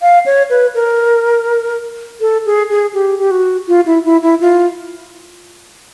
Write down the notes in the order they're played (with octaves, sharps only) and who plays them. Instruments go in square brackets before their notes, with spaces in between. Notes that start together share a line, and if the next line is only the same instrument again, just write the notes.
[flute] F5
C#5
B4
A#4
A4
G#4
G#4
G4
G4
F#4
F4
E4
E4
E4
F4